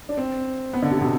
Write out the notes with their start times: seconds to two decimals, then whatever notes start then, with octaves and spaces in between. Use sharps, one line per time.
0.09 D4
0.17 C4
0.73 B3
0.82 D3
0.91 C3
1.01 B2